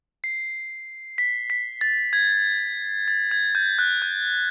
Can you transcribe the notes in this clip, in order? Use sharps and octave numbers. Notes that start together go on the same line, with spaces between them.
C7
B6
B6
A6
G#6
A6
G#6
G6
F#6
G6